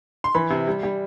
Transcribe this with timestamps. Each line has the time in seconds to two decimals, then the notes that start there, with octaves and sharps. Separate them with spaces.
0.24 C6
0.35 E3 B5
0.50 C3
0.68 G3
0.83 G3